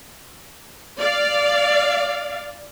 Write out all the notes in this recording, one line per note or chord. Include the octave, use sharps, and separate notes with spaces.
D5 F5